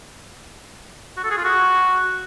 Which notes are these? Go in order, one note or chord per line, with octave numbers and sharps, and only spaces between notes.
F#4
A4
G#4
F4
F#4